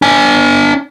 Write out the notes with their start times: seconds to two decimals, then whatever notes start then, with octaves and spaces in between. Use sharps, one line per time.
0.02 D4 G#5